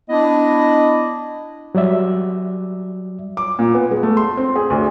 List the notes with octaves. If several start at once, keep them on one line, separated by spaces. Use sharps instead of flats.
B3 D4 E4 D#5
F#3 G3 D5 E5
D6
A#2
B3
G#3
A3
C6
C4
G#4
D2